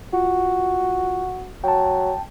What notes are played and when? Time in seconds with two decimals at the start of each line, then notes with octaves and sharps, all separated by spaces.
0.13 F4 F#4
1.64 F#3 G5 A5